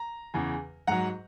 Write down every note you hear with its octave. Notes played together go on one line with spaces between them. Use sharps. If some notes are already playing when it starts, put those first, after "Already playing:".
Already playing: A#5
E2 C#3 E3
G#2 F#3 F#5 A#5